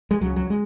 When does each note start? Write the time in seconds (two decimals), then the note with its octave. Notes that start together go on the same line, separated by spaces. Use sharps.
0.11 G#3
0.21 C#2 C#3 F#3
0.36 F#3
0.50 G#3